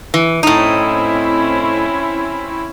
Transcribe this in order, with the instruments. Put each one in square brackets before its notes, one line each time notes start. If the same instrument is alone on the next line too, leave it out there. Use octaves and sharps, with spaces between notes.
[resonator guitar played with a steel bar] E3
[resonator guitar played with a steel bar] A2 D#4 [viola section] C4 C#4 E4